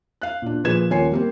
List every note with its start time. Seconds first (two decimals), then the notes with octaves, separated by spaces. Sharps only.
0.22 F5 F#6
0.42 A#2 D4
0.64 A#2 F3 G#4 B4 G#6 E7
0.90 D#1 A#3 F4 C#5 G#5 C7
1.12 G3 A#3 C4